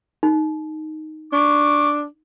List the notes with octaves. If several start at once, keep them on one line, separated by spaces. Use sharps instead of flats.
D#4
D4 C#6 D6